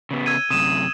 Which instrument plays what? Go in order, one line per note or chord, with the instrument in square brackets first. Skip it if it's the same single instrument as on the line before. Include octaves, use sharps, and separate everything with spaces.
[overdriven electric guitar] C#3 B3
[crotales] E6 G#6 D#7
[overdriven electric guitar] F#2 C3 [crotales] D#6 D#7 E7